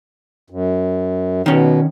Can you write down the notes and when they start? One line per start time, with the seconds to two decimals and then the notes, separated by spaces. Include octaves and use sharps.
0.50 F#2
1.46 B2 D#3 C#4